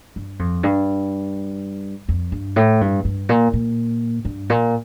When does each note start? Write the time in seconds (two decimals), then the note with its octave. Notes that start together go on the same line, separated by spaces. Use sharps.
0.16 G2
0.39 F2
0.63 G2
2.09 F2
2.32 G2
2.56 A2
2.81 G2
3.05 G2
3.29 A#2
3.53 A#2
4.25 G2
4.50 A#2